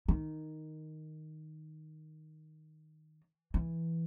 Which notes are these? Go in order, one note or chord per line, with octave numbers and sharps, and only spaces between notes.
D#3
E3